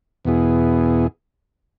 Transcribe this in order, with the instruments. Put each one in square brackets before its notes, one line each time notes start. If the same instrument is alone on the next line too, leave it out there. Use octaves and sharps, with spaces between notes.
[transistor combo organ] E2 B2 B3 E4 G#4